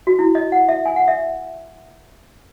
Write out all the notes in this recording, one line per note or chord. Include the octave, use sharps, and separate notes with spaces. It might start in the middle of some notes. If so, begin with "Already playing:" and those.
F#4
E4
D#5
F#5
E5
G#5
F#5
E5